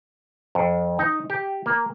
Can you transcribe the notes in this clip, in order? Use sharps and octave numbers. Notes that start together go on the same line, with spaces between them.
F2
D#4
G4
A#3